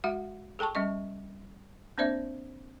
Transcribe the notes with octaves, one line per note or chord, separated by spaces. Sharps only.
G#3 F#4 E5 F#5
G#4 A4 G5 A5 C#6
G3 C#4 D#5 C#6
A#3 C4 D4 C5 D5 E5